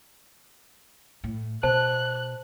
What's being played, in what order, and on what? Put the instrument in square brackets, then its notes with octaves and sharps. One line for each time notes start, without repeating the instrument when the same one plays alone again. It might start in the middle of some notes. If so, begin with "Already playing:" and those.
[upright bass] A2
[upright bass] B2 [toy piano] C5 A5 [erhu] F#6